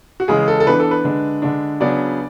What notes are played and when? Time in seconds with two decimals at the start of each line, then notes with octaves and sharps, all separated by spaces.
0.20 F#4
0.28 C#3 E3 G#3 G#4
0.48 A4
0.60 A4
0.67 E3 B3 D4 B4
0.80 A4
0.91 B4
1.04 D3 G#3 D4
1.42 D3 G#3 D4
1.80 C#3 F#3 B3 D4 D5